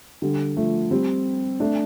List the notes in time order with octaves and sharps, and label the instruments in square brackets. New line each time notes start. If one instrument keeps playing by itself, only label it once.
[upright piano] D3 G3
F3 A3
G3 C4
A3 D4